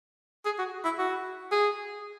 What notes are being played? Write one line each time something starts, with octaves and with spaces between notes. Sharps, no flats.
G#4
F#4
E4
F#4
G#4